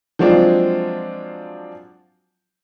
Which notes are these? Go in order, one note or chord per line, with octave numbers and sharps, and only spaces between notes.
F3 F#3 G#3 C4 D4 F4